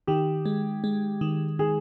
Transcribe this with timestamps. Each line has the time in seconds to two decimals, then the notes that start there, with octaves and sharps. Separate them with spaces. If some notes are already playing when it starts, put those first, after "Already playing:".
0.07 D#3 G4
0.46 G#3
0.84 G#3
1.21 D#3
1.59 D#3 G#4